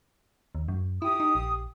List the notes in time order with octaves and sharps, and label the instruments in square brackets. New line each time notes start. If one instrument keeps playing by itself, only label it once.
[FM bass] D#2
F#2
[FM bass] E4 [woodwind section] G4 D#6
[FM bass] D#4
A#1